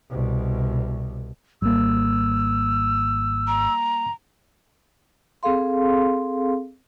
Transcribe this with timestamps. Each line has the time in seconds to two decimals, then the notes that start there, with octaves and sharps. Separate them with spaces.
0.11 C2 B2
1.62 G#1 G3 A#3 E6
3.48 A#5
5.43 C4 G#4 A4 F5 C6